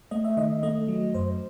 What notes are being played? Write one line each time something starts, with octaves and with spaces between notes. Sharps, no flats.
A3 D#5
E5
D#3 D#5
A3 D#5
F#3
F#2 C5